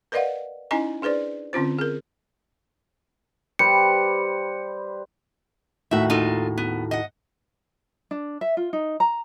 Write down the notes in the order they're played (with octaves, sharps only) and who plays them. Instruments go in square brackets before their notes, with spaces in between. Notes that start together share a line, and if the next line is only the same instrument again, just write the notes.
[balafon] A#4 B4 D5 D#5 F5 F#5
C#4 D#4 E4 D#5 G#5 A#5
D4 G#4 B4 C5 D5
D3 C4 C#4 F4 C5
G#4 A#4
[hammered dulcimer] G3 B4 C5 [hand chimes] C#7
[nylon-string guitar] D#2 A2 F#4 [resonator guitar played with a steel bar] E5
[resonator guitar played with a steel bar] D#4 F4 A4
B3
D#5 F#5
[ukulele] D4
E5
F4
D#4
A#5